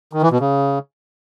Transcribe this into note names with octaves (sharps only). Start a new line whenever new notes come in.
D#3
E3
B2
C#3